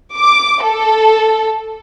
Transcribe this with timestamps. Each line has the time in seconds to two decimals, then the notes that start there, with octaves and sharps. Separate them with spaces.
0.16 D6
0.65 A4